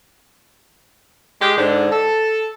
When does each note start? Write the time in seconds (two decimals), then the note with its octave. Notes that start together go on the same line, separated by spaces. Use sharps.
1.40 G#3 G4
1.56 G#2 D3
1.91 A4